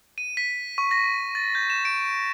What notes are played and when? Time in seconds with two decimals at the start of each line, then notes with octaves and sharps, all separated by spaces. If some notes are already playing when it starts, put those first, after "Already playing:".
0.18 D#7
0.37 B6
0.78 C#6
0.91 A#6
1.35 A6
1.55 G6
1.70 E7
1.85 D7